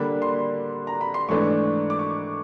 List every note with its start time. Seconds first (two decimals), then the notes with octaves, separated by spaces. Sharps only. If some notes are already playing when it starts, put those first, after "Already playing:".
Already playing: D3 G3 A#3 D4 B5
0.22 C6
0.87 A#5
1.01 B5
1.14 C6
1.28 G#2 E3 A3 D4 C#6
1.90 D6
1.99 C#6